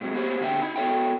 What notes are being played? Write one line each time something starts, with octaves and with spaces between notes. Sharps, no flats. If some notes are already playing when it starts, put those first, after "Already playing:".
G#2 C3 F3 F#3
A#3 B3 G4 A4 C5 C#5
A#2 D3 A#3 F#4 E5 G5
D#4 B5
B3 F#4 A4 C#5 E5 G5